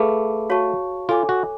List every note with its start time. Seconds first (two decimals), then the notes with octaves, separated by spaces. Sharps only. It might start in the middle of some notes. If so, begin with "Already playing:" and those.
Already playing: A3 G#4 B4 F5 B5 D6
0.50 F#4 C#5 F5 A5 C#6
1.09 F4 A4 C#5 G#5 D6
1.29 F#4